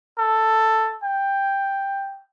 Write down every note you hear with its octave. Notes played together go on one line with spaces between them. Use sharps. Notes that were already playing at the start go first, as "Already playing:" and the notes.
A4
G5